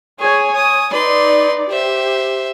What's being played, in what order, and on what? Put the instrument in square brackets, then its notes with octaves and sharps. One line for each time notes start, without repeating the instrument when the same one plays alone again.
[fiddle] G#4 [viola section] C#5 G#5
[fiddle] D#6
[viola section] D#4 D5 [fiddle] B4 C6
[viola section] G4 [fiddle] C5 E5